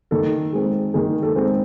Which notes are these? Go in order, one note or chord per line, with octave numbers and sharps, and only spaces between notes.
D#3 A4
G#3 C4
D#3 G#4
A4
G#3 C4